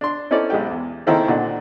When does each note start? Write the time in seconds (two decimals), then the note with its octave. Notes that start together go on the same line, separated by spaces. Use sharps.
0.01 D4 C6
0.31 C4 C#4 D#4 E4 A4 D5
0.50 B1 G#3 G4 G5
0.70 E2
1.07 C#2 D#3 A#3 C4 E4 A4
1.28 A#2 D3 D4 D#4 F#4